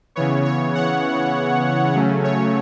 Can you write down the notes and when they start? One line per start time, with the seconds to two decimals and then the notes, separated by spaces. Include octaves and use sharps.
0.16 C#3 E3 B3 C#5
0.45 C#5
0.75 F#5
1.94 C#3 F#3 A3 C#4
2.24 C#5